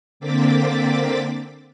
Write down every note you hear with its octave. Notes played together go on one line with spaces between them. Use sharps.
D3 A#3 C4 D6 A6 B6